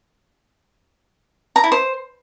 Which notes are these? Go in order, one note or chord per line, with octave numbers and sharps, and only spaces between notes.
A#5
E4
C5